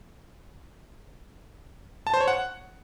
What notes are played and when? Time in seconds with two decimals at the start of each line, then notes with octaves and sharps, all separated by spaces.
2.07 A5
2.14 C5
2.21 C#5
2.28 F#5